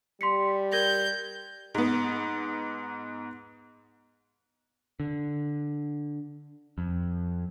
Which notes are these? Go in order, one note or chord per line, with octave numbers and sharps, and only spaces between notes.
G3 C6 B6 C#7
A#4 G6 G#6 A#6
G#2 B3
D3
F2